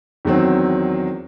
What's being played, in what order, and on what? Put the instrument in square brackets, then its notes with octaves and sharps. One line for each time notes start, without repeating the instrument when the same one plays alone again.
[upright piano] E2 D#3 F#3 C4